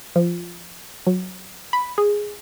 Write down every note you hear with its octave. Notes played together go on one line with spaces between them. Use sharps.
F3
F#3
B5
G#4